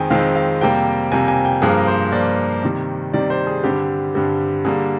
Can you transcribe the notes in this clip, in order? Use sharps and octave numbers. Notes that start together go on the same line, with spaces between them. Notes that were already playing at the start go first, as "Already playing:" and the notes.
Already playing: F2 D#3 G#3 C4 G5 G#5
F2 D#3 G#3 C4 F5
F5
F2 C3 G3 A#3 G5
F2 C3 G3 A#3 G#5
G#5
G5
G2 F3 A#3 G#4
A#4
G#4
C5
G2 F3 A#3 D5
C3 D#3 G3
C3 D#3 G3 D5
C5
G#4
G2 D3 G3 C4 G4
G2 D3 G3 C4
D3 G3 A#3 G#4